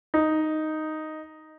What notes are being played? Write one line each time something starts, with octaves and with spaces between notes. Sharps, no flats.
D#4